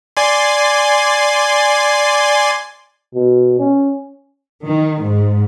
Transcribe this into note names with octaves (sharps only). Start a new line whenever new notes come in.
D5 G#5 C6
B2
C#4
D#3
G#2